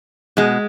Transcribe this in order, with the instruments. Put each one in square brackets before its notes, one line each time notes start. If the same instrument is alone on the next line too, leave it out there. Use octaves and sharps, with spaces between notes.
[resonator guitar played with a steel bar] B2 G#3